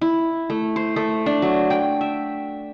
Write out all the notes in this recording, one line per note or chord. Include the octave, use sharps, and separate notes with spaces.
E4
A3
C5
A3
D4
F#3
G5
E5